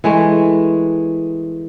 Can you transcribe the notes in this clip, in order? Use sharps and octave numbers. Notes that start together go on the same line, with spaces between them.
E3 G#3 A3